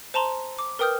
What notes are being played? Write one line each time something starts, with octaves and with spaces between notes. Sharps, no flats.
C5 A5 A#5 C6
D6
A#4 B4 G5 D#6 F6 G6